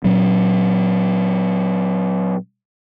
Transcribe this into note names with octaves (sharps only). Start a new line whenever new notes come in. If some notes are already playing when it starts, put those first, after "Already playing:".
A#2 F#3 C#4